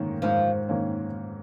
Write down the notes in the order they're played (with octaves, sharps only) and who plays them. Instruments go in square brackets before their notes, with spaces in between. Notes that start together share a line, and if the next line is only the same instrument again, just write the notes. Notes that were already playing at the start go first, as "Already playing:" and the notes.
Already playing: [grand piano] G#2 D#3 A#3 C#4
[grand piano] G#2 [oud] F3
[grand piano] D#3 A#3 C#4